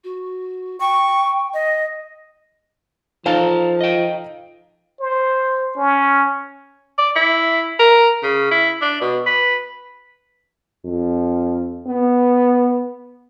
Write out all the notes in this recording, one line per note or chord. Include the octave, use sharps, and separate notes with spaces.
F#4
G5 C#6
D#5
F3 D#4 A4 C5 F5 A5 A#5
D#5 G5
C5
C#4
D5
E4
A#4
C#3
E4
D4
B2
B4
F2
B3